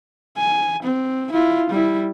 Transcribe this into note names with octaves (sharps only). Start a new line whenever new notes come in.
G#5
C4
E4 F4
G3 E4